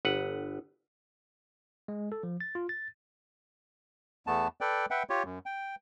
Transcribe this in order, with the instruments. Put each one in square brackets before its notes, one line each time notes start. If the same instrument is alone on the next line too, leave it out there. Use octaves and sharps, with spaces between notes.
[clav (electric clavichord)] G1 B4 F#5
[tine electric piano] G#3
A4
F3
A6
F4
A6
[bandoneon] E2 A3 B3 A5
A4 B4 D5 G5
B4 E5 F#5 G5
F4 G4 C#5
F#2
G5